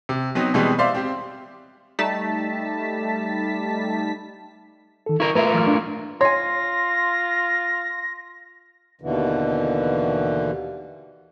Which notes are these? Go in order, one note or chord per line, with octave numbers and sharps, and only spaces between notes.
C3
F#3 B3 C4 D#4
B2 E3 G3 G#3 B3 C4
C5 D5 E5 F5 C6
C4 G4
G3 A3 D#4 A5 B6
D#3 A4
E4 A#4 C#6
A3 F4 A#4 B4 E5
E3 F#3 F6
D4
F4 C#5 G#5 C6 A#6
D#2 B2 D3 E3